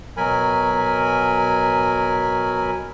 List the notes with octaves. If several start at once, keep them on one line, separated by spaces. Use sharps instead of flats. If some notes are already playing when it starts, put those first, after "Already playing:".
B2 F#3 A#4 G#5 B5